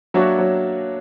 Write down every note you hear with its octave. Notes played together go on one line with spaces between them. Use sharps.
F#3 A#3 D4 F#4 C#5 E5
F#3